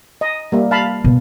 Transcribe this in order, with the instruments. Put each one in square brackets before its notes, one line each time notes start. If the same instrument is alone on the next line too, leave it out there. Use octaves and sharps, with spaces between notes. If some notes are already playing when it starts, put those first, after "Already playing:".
[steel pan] D#5
G3 A#3 E5
F5 A5 B5
[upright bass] B2